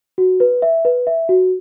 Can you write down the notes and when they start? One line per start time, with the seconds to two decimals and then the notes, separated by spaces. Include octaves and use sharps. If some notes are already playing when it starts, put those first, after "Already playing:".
0.18 F#4
0.40 B4
0.62 E5
0.85 B4
1.07 E5
1.29 F#4